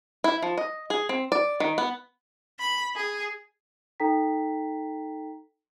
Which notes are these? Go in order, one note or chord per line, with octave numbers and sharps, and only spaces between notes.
E4
F3
D#5
G#4
C4
D5
D#3
B3
B5
G#4
D#4 A4 G5 A#5 B6